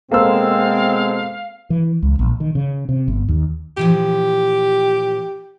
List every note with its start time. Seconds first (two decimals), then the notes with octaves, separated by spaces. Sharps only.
0.11 B2 G#3 A#3 C4 A4 C5 F5 E6
1.70 E3
2.02 C#2
2.19 A#1
2.40 D#3
2.55 C#3
2.89 C3
3.08 G1
3.28 D#2
3.77 A#2 E3 F3 G4